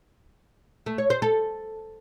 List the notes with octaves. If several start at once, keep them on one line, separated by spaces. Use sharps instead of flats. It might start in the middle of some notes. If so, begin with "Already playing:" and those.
A3
C#5
C5
A4